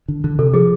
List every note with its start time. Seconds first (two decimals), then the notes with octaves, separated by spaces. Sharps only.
0.08 D3
0.24 D3
0.39 C3 A4
0.54 F3 G#4